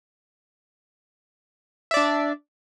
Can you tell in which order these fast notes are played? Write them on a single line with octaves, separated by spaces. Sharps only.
E5 D5 D4